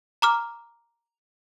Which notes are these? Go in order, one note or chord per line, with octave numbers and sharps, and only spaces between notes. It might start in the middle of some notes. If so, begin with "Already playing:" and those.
A#5 D6 F6